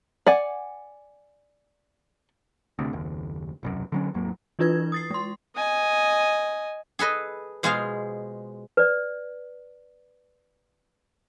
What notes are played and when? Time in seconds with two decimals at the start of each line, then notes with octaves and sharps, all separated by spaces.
0.26 D5 F#5 G#5
2.79 D2 C3
2.93 F#1 D#2
3.63 E1 C2 F#2
3.92 D3 F#3 C#4
4.14 G#1 D#2 F#3 A#3
4.59 E3 D4 E4 F4 B4 G#6
4.92 D#6 A6 C7
5.10 G#3 C6
5.55 D#5 G#5
6.99 G#4 A4 B4 D#5
7.63 B2 G#3 F4 G#4 C5 F5
8.77 B4 D5